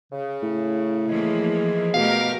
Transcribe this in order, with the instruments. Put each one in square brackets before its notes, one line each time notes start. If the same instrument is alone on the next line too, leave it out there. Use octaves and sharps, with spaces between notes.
[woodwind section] C#3
[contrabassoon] A2
[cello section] E3 F3 A#3 [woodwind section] G#3 G#4
[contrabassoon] B2 [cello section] A3 G4 A#4 [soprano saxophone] F5